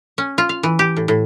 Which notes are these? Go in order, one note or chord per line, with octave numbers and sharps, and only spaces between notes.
C#4
F4
F5
E3
G4
A2
A2